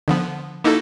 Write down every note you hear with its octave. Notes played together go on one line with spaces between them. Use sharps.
D3 F3 B3
A#3 D#4 E4 F#4 A4